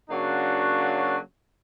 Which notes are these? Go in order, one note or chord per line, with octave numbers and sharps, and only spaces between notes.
C#3 F#3 A#3 D4 F#4